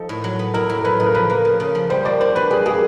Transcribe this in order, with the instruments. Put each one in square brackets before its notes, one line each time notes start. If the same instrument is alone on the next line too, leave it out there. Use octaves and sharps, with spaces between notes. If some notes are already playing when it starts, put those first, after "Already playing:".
Already playing: [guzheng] F3 D#4 [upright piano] A4
[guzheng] A2
F#3
B3
[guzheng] E4 [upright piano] A#4
[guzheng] A2
[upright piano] A#4
[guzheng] F#3 [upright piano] B4
[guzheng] C#3 [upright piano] B4
[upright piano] A#4
[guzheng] F3 [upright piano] B4
[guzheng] A#3
C#3
C#3
F3
[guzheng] G3 [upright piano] C5
[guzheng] A#3 [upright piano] D5
[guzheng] D4 [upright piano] C5
[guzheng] F#4 [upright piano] B4
[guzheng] G3 [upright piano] G#4
[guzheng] A#3 [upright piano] G#4